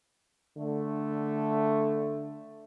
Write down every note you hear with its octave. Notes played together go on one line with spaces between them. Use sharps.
D3 A3